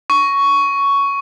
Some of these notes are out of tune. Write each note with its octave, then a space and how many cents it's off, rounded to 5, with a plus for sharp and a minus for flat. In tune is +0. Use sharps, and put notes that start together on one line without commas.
C#6 +10